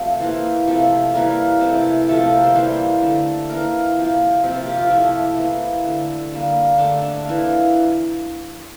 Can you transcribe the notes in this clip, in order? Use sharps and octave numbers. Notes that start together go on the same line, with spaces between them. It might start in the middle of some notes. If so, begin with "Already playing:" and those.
Already playing: C3 F3 A3
E3 A#3 C5
C3 F3 A3
E3 G3 A#3 A#4
C3 E3 A3
C3 F3 A3 A4
A4
A#4
C5
E3 G3 A#3 C5
D3 A3
E3 A#3 A#4
C3 F3 A#3
C3 F3 A#3 C4
F4
G4
F4
C3 F3 A3 E4
E3 A#3
D3 A3
D3 G3 A#3
D3 A3 D4
D4
E3 A#3